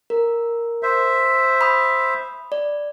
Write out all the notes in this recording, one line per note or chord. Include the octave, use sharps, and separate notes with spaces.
A#4
C5 E5
B5 D#6
D5